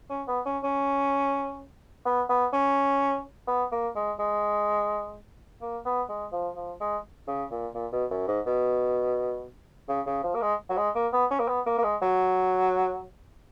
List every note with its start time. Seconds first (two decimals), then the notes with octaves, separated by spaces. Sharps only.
0.10 C#4
0.28 B3
0.46 C#4
0.63 C#4
2.06 B3
2.29 B3
2.53 C#4
3.48 B3
3.72 A#3
3.96 G#3
4.19 G#3
5.62 A#3
5.85 B3
6.09 G#3
6.32 F3
6.56 F3
6.80 G#3
7.28 C#3
7.51 A#2
7.75 A#2
7.92 B2
8.11 F#2
8.28 G#2
8.46 B2
9.89 C#3
10.06 C#3
10.24 F3
10.35 A#3
10.42 G#3
10.70 F#3
10.77 G#3
10.95 A#3
11.13 B3
11.31 C#4
11.40 A#3
11.48 B3
11.66 A#3
11.78 A#3
11.84 G#3
12.02 F#3